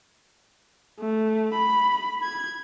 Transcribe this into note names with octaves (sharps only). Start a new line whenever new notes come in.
A3
B5
G#6